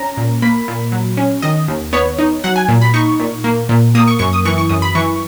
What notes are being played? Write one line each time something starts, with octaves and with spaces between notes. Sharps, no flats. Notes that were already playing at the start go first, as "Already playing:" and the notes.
Already playing: C#4 A#5
A#2
A#3 B5
A#2
F#3
C#4
D#3 D#5
D#2
B3 C#5
D#4
F#3 F#5
G#5
A#2
B5
D#4 C#6
A#2
A#3
A#2
A#3 D#6
C#6
F#2 C#6
D#6
E3 C#6
C#6
F#2 D#6
B5
E3 C#6